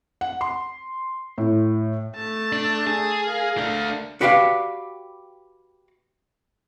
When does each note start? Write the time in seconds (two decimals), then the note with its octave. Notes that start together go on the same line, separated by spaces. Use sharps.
0.21 F#5
0.41 C6
1.38 A2
2.16 A3 A5
2.52 D4
2.87 G#4
3.25 A#4 F5
3.58 A3 D4
4.21 F#4 G4 B4 D5 F5